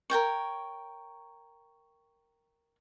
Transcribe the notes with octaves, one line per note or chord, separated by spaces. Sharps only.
A#4 C#5 G5 C#6